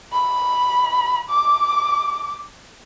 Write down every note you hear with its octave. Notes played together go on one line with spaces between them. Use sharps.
B5
D6